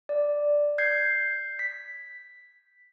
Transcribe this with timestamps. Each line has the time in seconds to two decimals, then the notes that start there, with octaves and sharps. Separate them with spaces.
0.09 D5
0.78 G6 G#6 C7
1.59 B6